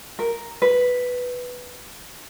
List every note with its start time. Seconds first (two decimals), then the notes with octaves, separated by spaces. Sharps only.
0.19 A#4
0.62 B4